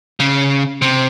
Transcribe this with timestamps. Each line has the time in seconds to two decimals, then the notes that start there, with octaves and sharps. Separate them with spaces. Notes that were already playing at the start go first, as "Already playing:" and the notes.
0.20 C#3
0.82 C3